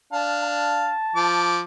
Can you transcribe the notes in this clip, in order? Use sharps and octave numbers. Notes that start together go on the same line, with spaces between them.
D4 F5 A5
A5
F3 D6